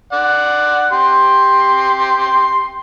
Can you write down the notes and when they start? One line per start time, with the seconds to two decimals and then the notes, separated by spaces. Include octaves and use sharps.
0.12 D5 F#5
0.93 G4 C6